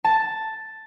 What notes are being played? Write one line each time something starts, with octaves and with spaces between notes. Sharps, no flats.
A5